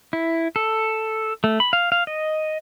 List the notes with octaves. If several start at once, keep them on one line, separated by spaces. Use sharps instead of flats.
E4
A4
A3
B5
F5
F5
D#5